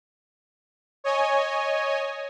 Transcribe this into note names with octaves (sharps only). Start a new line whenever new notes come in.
C#5 D#5 G#5